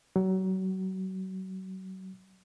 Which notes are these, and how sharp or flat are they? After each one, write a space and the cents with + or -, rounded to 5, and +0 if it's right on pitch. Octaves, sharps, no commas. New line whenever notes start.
F#3 +30